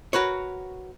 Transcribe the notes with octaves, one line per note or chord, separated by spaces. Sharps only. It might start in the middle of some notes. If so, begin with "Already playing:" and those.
F#4 A#4 B4 C#5